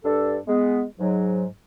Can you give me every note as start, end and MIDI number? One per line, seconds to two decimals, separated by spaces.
0.04 0.37 43
0.04 0.37 62
0.04 0.37 69
0.48 0.82 56
0.48 0.82 59
0.99 1.45 44
0.99 1.45 54